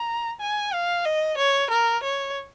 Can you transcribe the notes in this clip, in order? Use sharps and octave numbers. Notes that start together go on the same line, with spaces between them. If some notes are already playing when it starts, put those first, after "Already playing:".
Already playing: A#5
G#5
F5
D#5
C#5
A#4
C#5